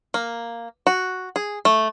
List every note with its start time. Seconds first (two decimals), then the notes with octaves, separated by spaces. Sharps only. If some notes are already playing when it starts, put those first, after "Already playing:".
0.14 A#3
0.87 F#4
1.36 G#4
1.65 A3